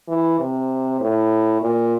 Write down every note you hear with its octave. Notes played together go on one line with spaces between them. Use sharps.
E3
C3
A2
A#2